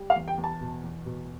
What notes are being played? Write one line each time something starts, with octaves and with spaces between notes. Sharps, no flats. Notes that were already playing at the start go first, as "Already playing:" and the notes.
Already playing: G3
F5
E2
G5
E2
A5
B2
E2
B2